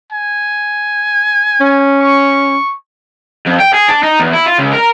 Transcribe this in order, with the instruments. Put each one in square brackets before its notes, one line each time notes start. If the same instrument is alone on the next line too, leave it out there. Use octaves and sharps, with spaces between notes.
[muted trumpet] G#5
[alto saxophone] C#4
[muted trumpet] C#6
[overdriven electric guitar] F2
G5
G#4
D4
D#4
E2
E4
F4
C#2
A#4